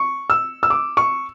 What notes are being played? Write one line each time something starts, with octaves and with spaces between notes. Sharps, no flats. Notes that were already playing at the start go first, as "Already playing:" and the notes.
Already playing: C#6
E6
E6
D6
C#6